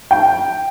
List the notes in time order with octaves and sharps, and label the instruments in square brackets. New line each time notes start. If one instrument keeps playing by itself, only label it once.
[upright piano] G5